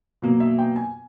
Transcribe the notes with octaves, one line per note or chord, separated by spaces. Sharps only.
B2 F#3 A#3
E5
G5
G#5